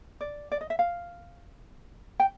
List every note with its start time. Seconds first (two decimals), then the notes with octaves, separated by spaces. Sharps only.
0.21 D5
0.52 D5
0.61 D#5
0.70 E5
0.79 F5
2.20 G5